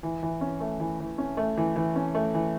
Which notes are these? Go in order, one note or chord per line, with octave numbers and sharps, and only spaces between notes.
E3
E3
C#4
A3
E3
E3
C#4
A3
E3
E3
C#4
A3
E3